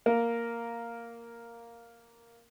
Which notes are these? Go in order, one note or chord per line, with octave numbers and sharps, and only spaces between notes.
A#3 A#4